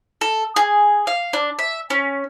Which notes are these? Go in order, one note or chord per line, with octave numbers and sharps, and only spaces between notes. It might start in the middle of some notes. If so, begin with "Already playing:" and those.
A4
G#4
F5
D4
E5
C#4